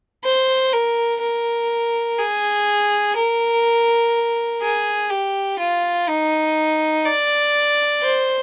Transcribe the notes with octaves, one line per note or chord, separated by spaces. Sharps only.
C5
A#4
A#4
G#4
A#4
G#4
G4
F4
D#4
D5
C5